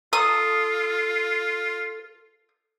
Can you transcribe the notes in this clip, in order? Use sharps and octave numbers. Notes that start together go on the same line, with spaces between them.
F4 A4 D#6